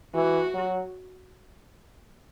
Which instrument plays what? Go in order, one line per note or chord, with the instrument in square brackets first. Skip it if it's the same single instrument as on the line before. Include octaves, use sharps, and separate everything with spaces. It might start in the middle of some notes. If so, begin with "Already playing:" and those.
[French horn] E3 [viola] F#4
[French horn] F#3